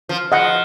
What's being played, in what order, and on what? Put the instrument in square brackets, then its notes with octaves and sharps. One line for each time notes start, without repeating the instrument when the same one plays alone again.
[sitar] F3
[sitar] F3 [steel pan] D#5 F#5